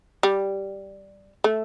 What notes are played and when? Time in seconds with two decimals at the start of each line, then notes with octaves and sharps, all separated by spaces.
0.23 G3
1.44 A3